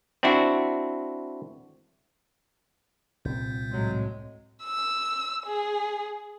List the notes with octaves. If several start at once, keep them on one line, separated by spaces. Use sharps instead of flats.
C4 D4 E4 F#4
C2 A#2 C4 G6
A2 F#3 G#3
E6
G#4